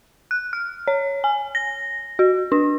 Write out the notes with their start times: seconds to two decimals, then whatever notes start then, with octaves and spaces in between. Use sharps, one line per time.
0.31 F#6
0.53 F6
0.87 C#5
1.24 G#5
1.55 A#6
2.19 F#4
2.52 D4